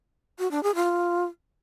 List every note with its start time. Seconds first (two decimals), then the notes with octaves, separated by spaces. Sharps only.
0.39 F#4
0.51 D4
0.63 G#4
0.75 F4